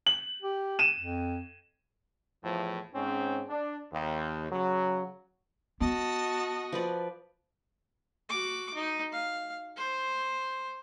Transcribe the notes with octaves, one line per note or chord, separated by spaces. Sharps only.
F#7
G4
D#7 E7
F2
E2 A2 F3
G#2 C4 C#4
D4
D#2
C#3 F#3
B3 F#4 D#5 A5
F3 B4 D5
F#4 D6
D#4
F5
C5